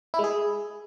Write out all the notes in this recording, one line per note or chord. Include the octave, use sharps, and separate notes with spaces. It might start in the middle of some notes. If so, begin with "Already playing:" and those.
E4
G#3
G#4